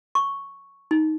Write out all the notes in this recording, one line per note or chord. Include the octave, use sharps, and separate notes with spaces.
C#6
D#4